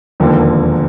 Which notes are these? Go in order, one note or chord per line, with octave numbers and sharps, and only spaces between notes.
E1 D#2 D3 F3 A#3